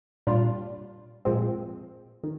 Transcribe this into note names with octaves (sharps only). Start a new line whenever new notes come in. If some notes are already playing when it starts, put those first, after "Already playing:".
A#2 G3 D4 F4
A#2 F3 G#3 C4
D#3